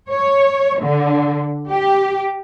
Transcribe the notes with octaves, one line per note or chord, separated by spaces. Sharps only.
C#5
D3
G4